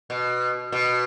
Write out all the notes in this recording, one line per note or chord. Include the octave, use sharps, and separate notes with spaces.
B2
B2